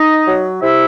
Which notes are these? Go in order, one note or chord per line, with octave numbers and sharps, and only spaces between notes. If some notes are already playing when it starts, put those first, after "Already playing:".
Already playing: D#4 D#5
F#3
C3 E4 E5